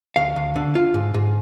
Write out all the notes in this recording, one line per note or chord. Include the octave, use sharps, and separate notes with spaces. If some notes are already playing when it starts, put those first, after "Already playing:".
D2 F5
D2
D3
F4
G#2
G#2